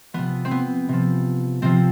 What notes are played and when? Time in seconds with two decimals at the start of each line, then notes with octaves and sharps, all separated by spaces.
0.14 C3 F3 B3
0.45 C4
0.51 B3
0.89 C3 F3
1.62 C3 F3 C4